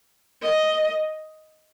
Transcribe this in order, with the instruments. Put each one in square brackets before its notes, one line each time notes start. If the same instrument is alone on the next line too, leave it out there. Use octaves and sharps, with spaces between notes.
[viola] D#5